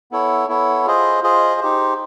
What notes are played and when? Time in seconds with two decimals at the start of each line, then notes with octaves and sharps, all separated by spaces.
0.11 B3 E4 A4 C#5
0.49 B3 E4 A4 C#5
0.86 F4 G#4 C5 D#5
1.23 F4 G#4 C5 D#5
1.61 D#4 G4 C5